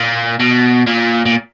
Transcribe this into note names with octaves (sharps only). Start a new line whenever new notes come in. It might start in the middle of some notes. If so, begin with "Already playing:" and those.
Already playing: A#2
B2
A#2
A#2